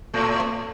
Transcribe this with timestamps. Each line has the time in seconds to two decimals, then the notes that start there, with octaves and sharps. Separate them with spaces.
0.14 A2 A3